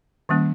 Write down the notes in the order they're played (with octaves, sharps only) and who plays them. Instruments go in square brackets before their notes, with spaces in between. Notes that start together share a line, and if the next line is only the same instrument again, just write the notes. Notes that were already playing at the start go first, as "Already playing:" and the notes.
[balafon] D#3 G3 A#3 C#4